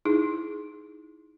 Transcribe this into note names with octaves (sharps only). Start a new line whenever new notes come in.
D#4 E4 G#4